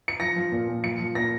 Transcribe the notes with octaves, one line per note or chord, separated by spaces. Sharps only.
C#7
F3 A#6
F3
A#2
A#2
F3 C#7
F3
A#2 A#6